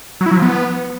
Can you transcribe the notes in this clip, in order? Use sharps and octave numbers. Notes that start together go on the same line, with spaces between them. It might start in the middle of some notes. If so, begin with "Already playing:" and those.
F#3
E4
F#3
F3
B3